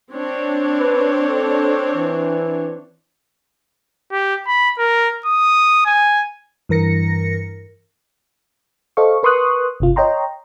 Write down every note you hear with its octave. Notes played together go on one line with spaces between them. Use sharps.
C4 D4 C#5
B4
A4
E3
G4
B5
A#4
D#6
G#5
G2 E3 A#4 A#6 C#7
A4 C5 D#5 F5 C#6
A#4 B4 C6 C#6 D#6 F#6
G1 C3 F4
C#5 D#5 G5 A#5 C6